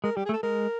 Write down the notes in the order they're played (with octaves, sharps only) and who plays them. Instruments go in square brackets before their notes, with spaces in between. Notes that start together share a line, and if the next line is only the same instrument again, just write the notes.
[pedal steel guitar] G#3 [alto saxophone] A#4
[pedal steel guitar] G3 [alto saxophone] G4
[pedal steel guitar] A3 [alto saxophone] G#4
[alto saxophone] A4
[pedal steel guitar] G#3 [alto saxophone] A#4